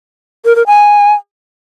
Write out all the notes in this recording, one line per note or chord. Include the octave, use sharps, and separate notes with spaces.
A#4
A#4
G#5